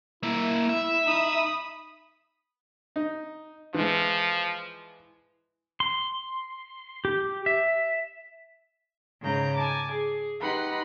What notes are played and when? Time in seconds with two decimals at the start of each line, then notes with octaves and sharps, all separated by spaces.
0.23 A#3 E4 E5
0.69 E5
1.06 D#4 B5 D#6
2.96 D#4
3.74 E3 F3 G#3
5.80 C6
7.05 G4
7.46 E5
9.21 G#2 C#3 G#3 A#5 G6
9.55 G#5 A5 D6
9.90 G#4
10.41 D#4 G4 B4 F#5 B5 C6